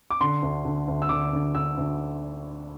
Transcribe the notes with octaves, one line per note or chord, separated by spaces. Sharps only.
D6
D3 C6
D2
D3
D2
E6
D3 D6
D2
D3 E6
D2